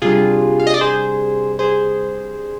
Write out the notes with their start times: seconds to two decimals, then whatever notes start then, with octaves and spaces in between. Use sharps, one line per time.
0.02 C3 G3 D4 F4 G#4
0.60 F5
0.67 D#5
0.74 D5
0.81 G#4 C5
1.59 G#4 C5